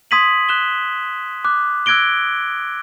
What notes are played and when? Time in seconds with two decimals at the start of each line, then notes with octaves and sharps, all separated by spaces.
0.11 C6 D#6 G#6 B6 D#7 F#7
0.49 F#6 E7 G7
1.45 D6 F#6
1.86 E6 F#6 G#6 A#6 D7 G7